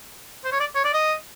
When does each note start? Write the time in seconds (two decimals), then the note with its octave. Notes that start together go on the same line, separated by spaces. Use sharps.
0.44 C5
0.52 C#5
0.60 D5
0.75 C#5
0.84 D5
0.94 D#5